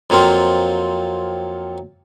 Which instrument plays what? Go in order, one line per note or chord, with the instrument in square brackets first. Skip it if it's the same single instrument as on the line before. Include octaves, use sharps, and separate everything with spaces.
[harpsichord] F2 F#3 A#3 C4 F4